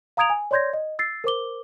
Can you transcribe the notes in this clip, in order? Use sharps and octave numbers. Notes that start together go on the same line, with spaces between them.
F5 A#5 D#6 G#6 D7 F7
G#5
C#5 D5 C6 G6 G#6 A#6
D#5
E6 A6 C7
A#4 C5 D6 G7